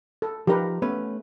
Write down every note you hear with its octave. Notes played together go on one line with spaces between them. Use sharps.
A4
F3 D#4 G4 A#4 B4
A3 B3 C#4 B4